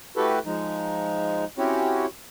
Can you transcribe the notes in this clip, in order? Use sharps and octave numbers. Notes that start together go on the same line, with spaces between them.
A3 E4 F#4 G4 A4 B4
F3 G#3 D#4
C4 C#4 E4 F#4 G4 C#5